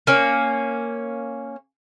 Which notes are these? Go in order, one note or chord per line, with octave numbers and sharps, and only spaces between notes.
A#3 C#4